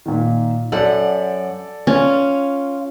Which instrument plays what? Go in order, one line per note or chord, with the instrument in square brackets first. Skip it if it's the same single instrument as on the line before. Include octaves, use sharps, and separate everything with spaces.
[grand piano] A#2 D#3
[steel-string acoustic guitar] F#2 F#5 [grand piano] A4 D5
[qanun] C#4 [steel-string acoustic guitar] F4